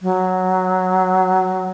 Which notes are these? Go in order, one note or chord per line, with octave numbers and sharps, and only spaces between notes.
F#3